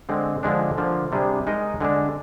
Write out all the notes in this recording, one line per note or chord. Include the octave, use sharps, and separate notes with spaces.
D3 G#3 C4
D3 F3 G#3 D4
D3 F3 A#3
C3 G3 D4 G#4
G#3 D#4 A#4 D#5
D3 G#3 D4